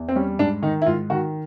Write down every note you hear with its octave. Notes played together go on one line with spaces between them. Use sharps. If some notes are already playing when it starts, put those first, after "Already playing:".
Already playing: E2
C4
G3 C#4
G#2 D4
D#3 D#4
E4
G#2 F4
D#3 F#4